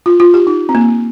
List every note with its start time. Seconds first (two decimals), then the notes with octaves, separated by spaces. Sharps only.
0.06 F4
0.20 F4
0.34 G4
0.47 D#4
0.69 C4
0.75 A#3